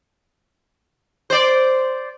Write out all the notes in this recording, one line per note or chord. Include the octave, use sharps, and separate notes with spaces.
C5 D5